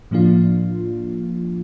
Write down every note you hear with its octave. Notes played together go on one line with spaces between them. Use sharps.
A2 F3 A#3 D4 F4